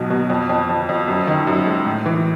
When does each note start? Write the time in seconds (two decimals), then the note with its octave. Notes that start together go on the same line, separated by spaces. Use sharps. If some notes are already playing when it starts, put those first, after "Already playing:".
Already playing: B1 B2 F#3
0.10 B2
0.30 F2
0.49 F2
0.69 F2
0.89 F2
1.08 F#2
1.27 D#3
1.47 F#2
1.67 G#3
1.86 A2
2.06 E3